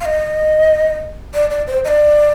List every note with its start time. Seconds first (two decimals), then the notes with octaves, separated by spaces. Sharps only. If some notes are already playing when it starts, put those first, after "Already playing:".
0.01 F5
0.05 D#5
1.34 D5
1.51 D5
1.67 C5
1.85 D#5
1.88 D5